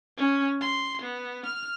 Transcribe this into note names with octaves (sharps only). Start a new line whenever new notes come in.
C#4
C6
B3
F6